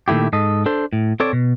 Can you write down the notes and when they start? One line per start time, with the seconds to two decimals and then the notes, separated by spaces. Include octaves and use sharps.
0.08 A#2 D#3 A3 E4 G4
0.33 G#2 A4 D#5
0.66 D4 A4 C5
0.93 A2
1.20 C4 A4 C#5 D5
1.33 B2